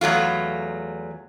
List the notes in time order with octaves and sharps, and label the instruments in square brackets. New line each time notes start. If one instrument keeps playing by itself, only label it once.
[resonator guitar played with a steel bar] E2 F#3 A3 F4